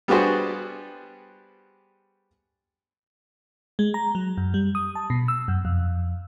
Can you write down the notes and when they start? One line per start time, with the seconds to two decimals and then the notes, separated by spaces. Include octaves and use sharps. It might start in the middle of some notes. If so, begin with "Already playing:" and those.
0.08 G3 B3 D4 F#4 G#4 C5
3.79 G#3
3.94 A#5
4.15 F#3
4.37 F#2
4.54 G3
4.75 D#6
4.95 A5
5.10 B2
5.28 E6
5.48 F#2
5.65 F2